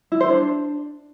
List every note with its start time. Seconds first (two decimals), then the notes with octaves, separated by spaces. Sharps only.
0.12 E4
0.20 C5
0.29 D4